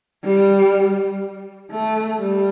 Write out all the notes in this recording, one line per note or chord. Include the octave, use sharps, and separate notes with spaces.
G3
A3
G3